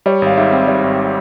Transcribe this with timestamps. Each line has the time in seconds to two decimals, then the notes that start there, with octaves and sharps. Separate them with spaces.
0.06 G3 C#5
0.22 G#1 F5
0.37 G#2 E5
0.52 C4
0.68 G3 C#5
0.84 G#1